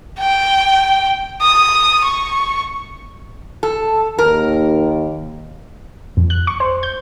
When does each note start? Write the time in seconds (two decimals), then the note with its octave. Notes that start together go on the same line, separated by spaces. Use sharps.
0.20 G5
1.42 D#6
2.05 C#6
3.63 A4
4.19 D#2 A#4
6.17 F2
6.30 F#6
6.47 C#6
6.60 C5
6.83 G6